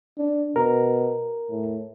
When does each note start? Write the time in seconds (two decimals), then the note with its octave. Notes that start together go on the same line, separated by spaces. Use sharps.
0.18 D4
0.56 B2 A#4
1.50 A2